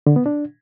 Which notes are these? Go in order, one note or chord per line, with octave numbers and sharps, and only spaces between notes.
D3
B3
D4